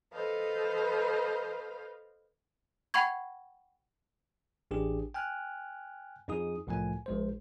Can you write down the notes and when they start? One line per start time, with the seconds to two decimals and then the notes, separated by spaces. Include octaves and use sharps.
0.12 A4 B4 C5 D#5 F5
2.94 F#5 G5 B5 C#6 G#6
4.71 A1 D4 G4 G#4
5.14 G5 G#5 F6 F#6
6.28 F2 F3 D#4 G#4 D#6
6.67 C2 A2 F3 A3 G#5
7.06 A#1 G#3 C5